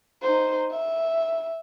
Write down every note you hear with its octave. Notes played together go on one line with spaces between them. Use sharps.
D#4 C5
E5